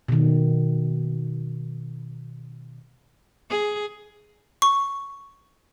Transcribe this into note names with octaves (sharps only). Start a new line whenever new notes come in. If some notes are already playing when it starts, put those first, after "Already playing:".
B2 D#3
G#4
C#6